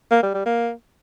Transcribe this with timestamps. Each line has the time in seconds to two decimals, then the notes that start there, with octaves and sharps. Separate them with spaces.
0.11 A#3
0.22 G3
0.34 G3
0.45 A#3